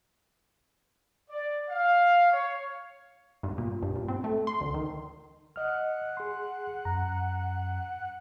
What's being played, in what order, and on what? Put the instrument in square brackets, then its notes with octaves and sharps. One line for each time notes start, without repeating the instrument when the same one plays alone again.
[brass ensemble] D5
F5
C#5
[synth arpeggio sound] G2
A#2
G2
A#2
C4
A3
C6
D2
D#3
[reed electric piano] D#5 F6 [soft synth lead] F#5
[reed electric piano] G#4 C6
[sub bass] F#2 [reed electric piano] A#5